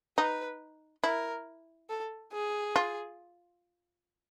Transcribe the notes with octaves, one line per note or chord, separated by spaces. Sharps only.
D#4 B4
E4 A#4
A4
G#4
F4